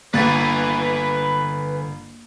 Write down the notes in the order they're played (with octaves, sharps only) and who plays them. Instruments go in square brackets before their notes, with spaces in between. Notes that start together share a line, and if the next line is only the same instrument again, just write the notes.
[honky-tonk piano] G1 [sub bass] D3 [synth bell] A#3 A6 [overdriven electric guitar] B4 G#5